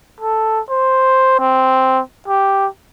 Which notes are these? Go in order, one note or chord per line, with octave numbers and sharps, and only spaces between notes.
A4
C5
C4
G4